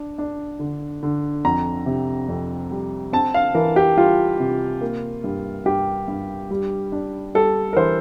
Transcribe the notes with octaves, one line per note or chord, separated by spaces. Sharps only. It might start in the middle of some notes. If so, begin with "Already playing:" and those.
Already playing: D4
D4
D3
D3
F2 A#5
C3
F2
G3
C4 A5
F5
E3 A#4
G4
G3 F4
C3
A#3
G2
G2 G4
G2
G3
D4
G3 A4
A#4
E3 C5